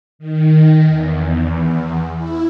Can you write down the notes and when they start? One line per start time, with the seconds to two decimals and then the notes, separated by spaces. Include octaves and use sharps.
0.19 D#3
0.85 E2
2.17 E4